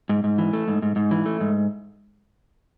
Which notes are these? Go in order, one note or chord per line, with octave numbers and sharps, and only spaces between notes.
G#2
G#2
E3
A3
G#2
G#2
G#2
E3
A3
G#2